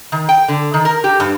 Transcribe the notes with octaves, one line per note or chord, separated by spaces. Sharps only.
D#3
G5
D3
D#3
A#4
G4
G2